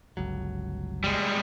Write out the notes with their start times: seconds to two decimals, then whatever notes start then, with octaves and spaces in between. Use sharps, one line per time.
0.17 G1 C#2 F#3
1.04 G3 G#3